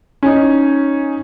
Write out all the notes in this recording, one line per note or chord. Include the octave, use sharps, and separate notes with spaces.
C#4 D#4